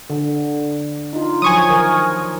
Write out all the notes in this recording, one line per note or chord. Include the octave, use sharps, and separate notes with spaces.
D3
D#4 F4
F3 F#3 G#5 C#6 D#6
D#3 A#4